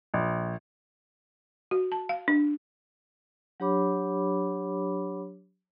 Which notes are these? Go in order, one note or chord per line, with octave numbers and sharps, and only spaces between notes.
A#1
F#4
A5
F5
D4
F#3 D4 G4 C#5 B5 D6